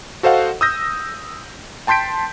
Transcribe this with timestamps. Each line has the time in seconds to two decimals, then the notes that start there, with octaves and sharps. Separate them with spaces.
0.23 F#4 A4 C5 D#5 F5 F#5
0.61 D#6 E6 G6 A#6
1.87 G5 A5 C6 G6 B6 D7